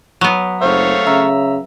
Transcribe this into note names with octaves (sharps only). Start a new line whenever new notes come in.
F#3 B3
F#1 A3 C5 C#5 F5
C#3 E5 A#5 E6